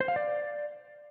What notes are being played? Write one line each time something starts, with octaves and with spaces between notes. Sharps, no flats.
C5
F5
D5